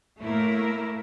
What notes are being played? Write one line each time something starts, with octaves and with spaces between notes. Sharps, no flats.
A2 A3 A#3 E4 A#4